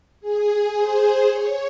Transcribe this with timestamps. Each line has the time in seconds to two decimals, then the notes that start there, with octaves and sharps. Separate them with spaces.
0.21 G#4
0.73 C5
1.26 C#5